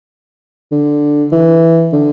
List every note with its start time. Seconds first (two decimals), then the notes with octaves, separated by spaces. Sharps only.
0.72 D3
1.32 E3
1.93 D3